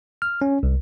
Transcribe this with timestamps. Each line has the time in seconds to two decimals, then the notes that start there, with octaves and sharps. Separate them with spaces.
0.22 F6
0.42 C#4
0.63 C2